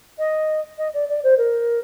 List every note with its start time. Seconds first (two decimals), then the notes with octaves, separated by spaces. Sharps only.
0.18 D#5
0.77 D#5
0.93 D5
1.08 D5
1.23 C5
1.37 A#4